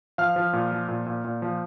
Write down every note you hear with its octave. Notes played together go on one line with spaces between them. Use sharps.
F3 F5 F6
F3
A#2
F3
A#2
A#2
A#2
F3